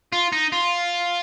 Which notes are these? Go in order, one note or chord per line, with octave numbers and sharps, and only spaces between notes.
F4
D#4
F4